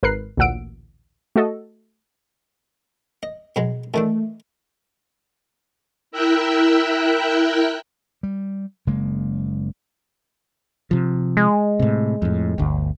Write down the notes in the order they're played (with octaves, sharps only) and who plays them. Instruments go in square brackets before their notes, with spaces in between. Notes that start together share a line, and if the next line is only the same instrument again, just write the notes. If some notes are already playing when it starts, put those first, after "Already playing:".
[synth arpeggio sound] G#1 A#4 B4 F#6 C7
A1 D2 A#2 F#5 E6 D7
A3 F#4 A4 D#5
[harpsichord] D#5
B2 F#3 G#3
[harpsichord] D#3 E3 D4 [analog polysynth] A3
[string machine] E4 A#4 E5 G5 E6 F#6
[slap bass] G3
F#1 C#3 G#3 A#3
[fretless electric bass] C3 F3
[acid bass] G#3
[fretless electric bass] A2 C3
F2 A2
G1 D2